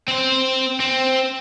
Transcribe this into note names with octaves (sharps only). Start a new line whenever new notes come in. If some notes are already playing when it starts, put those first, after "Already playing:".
C4 C5
C4